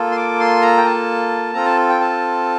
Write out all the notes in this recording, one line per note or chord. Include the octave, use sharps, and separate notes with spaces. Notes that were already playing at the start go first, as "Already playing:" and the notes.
Already playing: A#3 F4 A4
C6
D6
C6
A#5
G5
A5
C4 F4 A4 A#5
A5
G5
A5